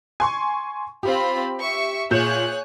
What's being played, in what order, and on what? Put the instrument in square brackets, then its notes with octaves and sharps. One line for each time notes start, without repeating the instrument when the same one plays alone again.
[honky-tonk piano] G#5 C6 C#6
[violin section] C4 F4 B5 [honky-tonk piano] G4
[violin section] E5 C#6
[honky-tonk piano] A#2 G6 E7 [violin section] G#4 C#5 F#6